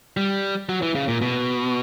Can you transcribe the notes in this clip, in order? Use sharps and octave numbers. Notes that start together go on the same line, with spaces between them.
G3
F#3
E3
C#3
A#2
B2